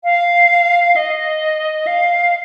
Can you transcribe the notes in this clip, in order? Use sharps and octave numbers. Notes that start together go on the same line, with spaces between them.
F5
D#5
F5